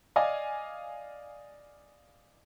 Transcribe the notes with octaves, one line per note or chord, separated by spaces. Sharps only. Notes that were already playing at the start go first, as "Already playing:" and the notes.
D5 D#5 F5 G#5